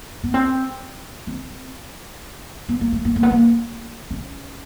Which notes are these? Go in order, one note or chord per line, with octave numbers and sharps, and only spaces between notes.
B3
C4
C4
B3
A#3
A3
A#3
A#3
B3
A#3
C#4